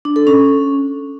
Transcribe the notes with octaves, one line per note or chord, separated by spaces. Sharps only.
D4
A4
C#4